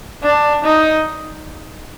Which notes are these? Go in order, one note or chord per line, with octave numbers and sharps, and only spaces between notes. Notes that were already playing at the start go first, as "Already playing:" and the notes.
D4
D#4